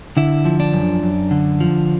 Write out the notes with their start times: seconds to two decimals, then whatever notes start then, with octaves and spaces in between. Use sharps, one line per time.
0.17 D3 E4
0.45 F3
0.60 D4
0.73 F#2
1.03 F#2
1.31 D3
1.60 F3